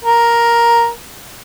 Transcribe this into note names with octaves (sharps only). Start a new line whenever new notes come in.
A#4